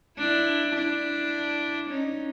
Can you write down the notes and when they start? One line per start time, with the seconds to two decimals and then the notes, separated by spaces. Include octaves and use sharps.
0.18 D4 E4
0.75 D4 E4
1.90 C#4 D#4